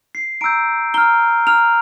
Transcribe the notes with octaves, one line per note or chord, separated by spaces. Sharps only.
C7
A#5 E6 G6 D7
A#5 F6 G7
A#5 F6 F7